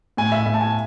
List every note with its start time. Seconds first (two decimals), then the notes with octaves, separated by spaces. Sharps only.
0.17 A2 G#5
0.32 E5
0.46 A2 E5
0.54 A5
0.61 G#5